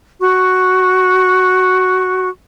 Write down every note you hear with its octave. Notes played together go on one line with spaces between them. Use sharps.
F#4 C#6